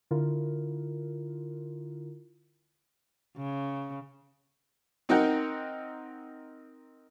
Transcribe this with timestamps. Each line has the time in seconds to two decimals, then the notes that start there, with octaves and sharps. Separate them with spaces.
0.11 D3 E4 F4 A#4
3.37 C#3
5.09 C4 D#4 A#4 F#5 G5